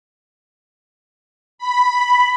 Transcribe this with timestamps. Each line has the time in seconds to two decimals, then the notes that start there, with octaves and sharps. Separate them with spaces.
1.58 B5